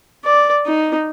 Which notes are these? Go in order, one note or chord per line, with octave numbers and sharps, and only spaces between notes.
D5
D#4